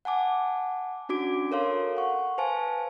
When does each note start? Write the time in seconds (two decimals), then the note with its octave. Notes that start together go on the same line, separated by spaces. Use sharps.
0.05 F#5 G#5 A5 D6
1.09 C#4 D4 F#4 D6 D7
1.51 A4 A#4 C#5 F5 C6
1.97 F#5 C#6
2.38 B4 C5 F5 G#5 A5